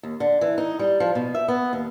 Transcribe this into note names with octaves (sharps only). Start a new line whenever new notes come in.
D#2
D3
E3
D#4
G3
F3
B2
E5
B3
D#2